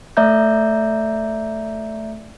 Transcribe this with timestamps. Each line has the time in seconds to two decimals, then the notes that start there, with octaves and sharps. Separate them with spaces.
0.17 A3 D5 E5 A#5 G6